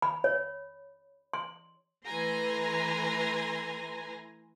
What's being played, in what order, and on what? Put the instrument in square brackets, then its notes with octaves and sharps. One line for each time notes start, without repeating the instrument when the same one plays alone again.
[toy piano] B5
C#5
C6
[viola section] E3 A3 B4 G#5 A#5 C6